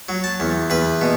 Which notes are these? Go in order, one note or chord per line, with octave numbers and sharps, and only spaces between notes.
F#3
A5
E2
E2 B4
B2